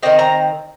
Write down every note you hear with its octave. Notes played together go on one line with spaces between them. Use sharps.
D#3 C4 D#5
A#5